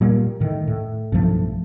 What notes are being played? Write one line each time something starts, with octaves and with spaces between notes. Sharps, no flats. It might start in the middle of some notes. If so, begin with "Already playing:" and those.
A#2 G3 A#3
A2 D#3
A2
B1 G2 F3 A3